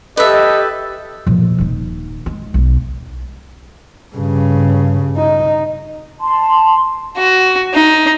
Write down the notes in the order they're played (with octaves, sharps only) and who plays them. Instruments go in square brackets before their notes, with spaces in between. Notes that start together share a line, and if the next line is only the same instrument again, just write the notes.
[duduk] G4 [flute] A4 [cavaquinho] B4 E5 [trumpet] D#5
[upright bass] A#2 F3
D#1 D#4
G#3
B1
[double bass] G2 C#3
D#4
[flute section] A5 C6
[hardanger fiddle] F#4
D#4